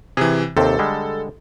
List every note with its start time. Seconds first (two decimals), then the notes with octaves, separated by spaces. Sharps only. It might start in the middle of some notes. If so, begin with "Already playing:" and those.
0.17 C3 E3 G#4
0.57 D#2 C3 C4 A4
0.79 D3 G3 G#3